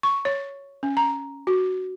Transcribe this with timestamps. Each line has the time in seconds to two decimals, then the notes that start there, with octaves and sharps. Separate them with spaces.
0.03 C#6
0.25 C#5
0.83 C#4
0.97 A#5
1.47 F#4